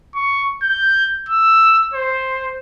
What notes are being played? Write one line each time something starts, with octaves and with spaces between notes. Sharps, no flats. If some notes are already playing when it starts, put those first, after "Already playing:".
C#6
G6
E6
C5